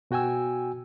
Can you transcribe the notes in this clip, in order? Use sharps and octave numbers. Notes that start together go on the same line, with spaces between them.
B2 F#4 G5 G#5 E6